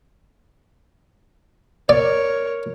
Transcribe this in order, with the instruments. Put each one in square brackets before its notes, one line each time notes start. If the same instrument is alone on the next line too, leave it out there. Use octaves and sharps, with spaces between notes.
[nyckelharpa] A#4 C#5 [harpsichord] D5